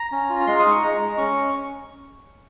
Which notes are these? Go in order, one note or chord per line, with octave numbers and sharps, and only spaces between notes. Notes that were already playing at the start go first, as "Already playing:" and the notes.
Already playing: A#5
C#4
F4
A#5
G#3 C6
D#6
D#4
C#6
G#3 A#5
G#3
C#4 C#6